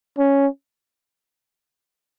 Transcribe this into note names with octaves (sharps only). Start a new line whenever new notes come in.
C#4